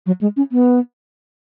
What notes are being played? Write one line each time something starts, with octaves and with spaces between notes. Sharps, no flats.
F#3
G#3
C#4
B3